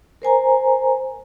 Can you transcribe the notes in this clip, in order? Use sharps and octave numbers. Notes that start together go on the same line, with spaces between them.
A#4 C5 G#5 A#5